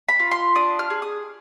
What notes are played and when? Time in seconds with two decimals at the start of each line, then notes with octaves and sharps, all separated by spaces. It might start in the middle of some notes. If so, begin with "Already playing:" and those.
0.09 B5
0.19 F4
0.31 C6
0.55 D4 D#6
0.79 F6
0.90 G#4
1.02 D#6